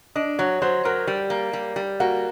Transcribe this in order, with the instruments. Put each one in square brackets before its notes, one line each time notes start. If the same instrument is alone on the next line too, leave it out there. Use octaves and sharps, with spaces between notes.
[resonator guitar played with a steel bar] D4 [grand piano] D#5
[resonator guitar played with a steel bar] F#3 [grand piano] C#5
[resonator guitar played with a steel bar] F#3 [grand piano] C5
[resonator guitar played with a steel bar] F#3 [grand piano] A#4
[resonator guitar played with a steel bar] G3
A#3
G3
G3
[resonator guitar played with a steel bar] A#3 [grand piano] F#4